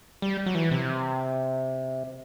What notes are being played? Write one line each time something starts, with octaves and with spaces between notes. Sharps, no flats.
G3
F#3
E3
C3